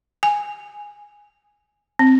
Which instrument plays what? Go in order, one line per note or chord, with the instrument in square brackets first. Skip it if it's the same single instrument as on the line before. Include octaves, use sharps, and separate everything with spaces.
[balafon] G#5
C4